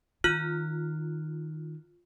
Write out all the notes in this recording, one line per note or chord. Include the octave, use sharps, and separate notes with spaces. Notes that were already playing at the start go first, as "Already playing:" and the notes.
D#3 F4 F6 F#6